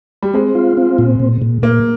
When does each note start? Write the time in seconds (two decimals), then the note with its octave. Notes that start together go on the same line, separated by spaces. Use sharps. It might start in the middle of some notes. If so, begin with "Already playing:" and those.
0.22 G3
0.34 G#3 C4
0.55 F4
0.77 C4
0.98 A#2
1.20 A#2
1.42 A#2
1.62 A#2 A#3